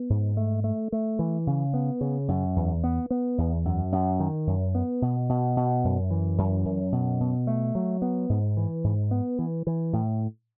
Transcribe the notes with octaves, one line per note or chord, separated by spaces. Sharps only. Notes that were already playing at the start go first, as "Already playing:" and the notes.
Already playing: B3
G#2
A3
A3
A3
E3
C#3
B3
C#3
F#2
E2
B3
B3
E2
F#2
F#2
D#3
F#2
B3
B2
B2
B2
F#2
E3
F#2
F#2
B2
B2
A3
F#3
B3
G#2
E3
G#2
B3
E3
E3
A2